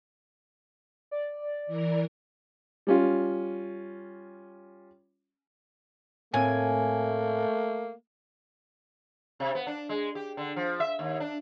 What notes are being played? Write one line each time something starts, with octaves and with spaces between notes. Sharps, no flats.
D5
E3 A#4
G3 C#4 F4
A2 A3 A#3 C4 G#5
C3
B3
D4
G#3
G4
D3
F3
E5
D#2
D4